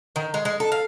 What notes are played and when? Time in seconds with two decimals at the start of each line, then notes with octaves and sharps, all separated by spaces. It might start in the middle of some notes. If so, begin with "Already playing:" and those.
0.16 D#3
0.34 G#3
0.45 G#3
0.60 A4
0.72 F5